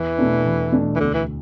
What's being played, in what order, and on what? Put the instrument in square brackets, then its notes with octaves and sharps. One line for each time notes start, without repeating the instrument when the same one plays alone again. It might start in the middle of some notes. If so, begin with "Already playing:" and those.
Already playing: [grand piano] E2 [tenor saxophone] E3
[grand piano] B2 A3 D4
E2
B2 A3 D4
[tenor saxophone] E3
[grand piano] D2 [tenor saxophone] D3
[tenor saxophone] E3